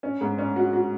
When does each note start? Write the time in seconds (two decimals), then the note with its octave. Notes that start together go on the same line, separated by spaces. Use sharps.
0.03 C#4
0.21 G#2
0.38 C#4
0.56 F#4
0.73 F#4